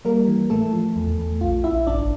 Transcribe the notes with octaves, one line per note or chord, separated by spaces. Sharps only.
G3 A#3 A#4
E3
A2 A3 A4
F3
E2
E2
A#1 F4
A#1 E4 E5
G1 D4 D5